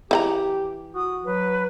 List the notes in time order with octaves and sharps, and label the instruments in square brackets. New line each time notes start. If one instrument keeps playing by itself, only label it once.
[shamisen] E3 F#5 A#5 [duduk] G4
[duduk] F#4 [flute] D#6
[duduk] F#3 [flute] B4